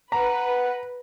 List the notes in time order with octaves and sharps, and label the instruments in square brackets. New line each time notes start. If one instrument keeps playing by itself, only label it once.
[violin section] B4 [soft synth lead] F#5 [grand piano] A#5